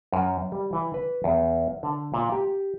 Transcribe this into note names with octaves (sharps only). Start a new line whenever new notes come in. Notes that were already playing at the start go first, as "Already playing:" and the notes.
F#2
G3
E3
B4
E2
D3
A#2
G4